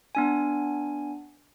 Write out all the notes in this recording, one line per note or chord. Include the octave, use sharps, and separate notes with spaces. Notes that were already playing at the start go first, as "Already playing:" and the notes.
B3 D4 G#5